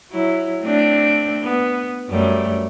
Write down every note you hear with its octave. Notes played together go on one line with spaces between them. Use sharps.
F#3 E4
A3 C4 D4
B3
F#2 G3 A3